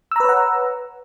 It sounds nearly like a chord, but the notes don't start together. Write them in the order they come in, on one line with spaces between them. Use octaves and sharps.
E6 A#5 B4 C#5 F#5